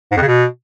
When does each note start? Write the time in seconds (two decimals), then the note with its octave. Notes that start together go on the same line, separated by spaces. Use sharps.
0.11 G#2
0.17 F2
0.22 C#3
0.27 B2